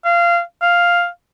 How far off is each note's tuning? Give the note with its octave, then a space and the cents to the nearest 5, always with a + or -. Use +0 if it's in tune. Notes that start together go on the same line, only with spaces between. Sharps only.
F5 -20
F5 +0